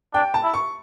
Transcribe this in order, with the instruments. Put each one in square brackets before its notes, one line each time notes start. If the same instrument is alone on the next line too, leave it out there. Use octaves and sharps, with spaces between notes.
[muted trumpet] D4 [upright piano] G5
[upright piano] A5
[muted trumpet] E4
[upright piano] C#6